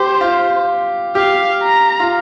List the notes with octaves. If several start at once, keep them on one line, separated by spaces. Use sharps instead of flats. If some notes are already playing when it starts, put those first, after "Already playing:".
Already playing: G4 C5
F4
G4 F5
A#5
F4